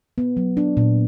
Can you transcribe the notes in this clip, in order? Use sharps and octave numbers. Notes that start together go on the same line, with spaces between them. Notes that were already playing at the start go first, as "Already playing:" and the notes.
B3
F#3
D4
A#2